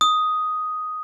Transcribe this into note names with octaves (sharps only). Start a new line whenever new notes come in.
D#6